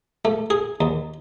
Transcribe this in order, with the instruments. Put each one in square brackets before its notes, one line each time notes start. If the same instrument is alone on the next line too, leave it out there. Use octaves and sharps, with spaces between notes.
[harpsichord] A3
G#4
D#2